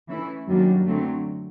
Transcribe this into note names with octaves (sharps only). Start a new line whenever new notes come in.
E3 A3 C#4 E4
F#2 D#3 F#3 G3 A#3 D4
D3 F#3 A3 C4